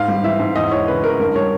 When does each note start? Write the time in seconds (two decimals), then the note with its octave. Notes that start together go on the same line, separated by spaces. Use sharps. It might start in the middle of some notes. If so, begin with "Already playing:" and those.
Already playing: G#2 F5
0.08 G3
0.24 E3 E5
0.40 G#2
0.56 E2 D#5
0.71 E3 C#5
0.88 C#3 B4
1.04 E2 A#4
1.20 G2 A#4
1.36 G3 C#5